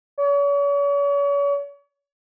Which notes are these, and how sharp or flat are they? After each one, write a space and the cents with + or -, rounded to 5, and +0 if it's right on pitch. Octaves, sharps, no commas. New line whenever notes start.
C#5 +40